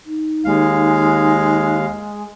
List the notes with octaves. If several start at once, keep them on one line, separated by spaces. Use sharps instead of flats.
D#4
D#2 G#3 F5